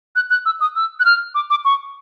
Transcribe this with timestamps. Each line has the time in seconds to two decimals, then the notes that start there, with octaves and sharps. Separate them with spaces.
0.16 F#6
0.30 F#6
0.46 E6
0.61 D#6
0.76 E6
1.00 F#6
1.05 F6
1.35 D6
1.50 D6
1.65 C#6